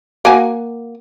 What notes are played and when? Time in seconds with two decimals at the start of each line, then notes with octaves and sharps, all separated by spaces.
0.25 A#3 F#4 G#5